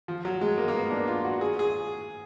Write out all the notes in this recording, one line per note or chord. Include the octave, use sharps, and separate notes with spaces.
F3
F#3
G#3
A#3
A#3
B3
D4
F4
F#4
G#4
G#4